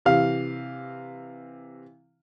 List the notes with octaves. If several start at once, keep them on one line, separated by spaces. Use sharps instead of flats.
C3 E3 F5